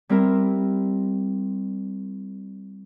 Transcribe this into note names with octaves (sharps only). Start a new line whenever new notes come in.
G3 C4 E4 A#4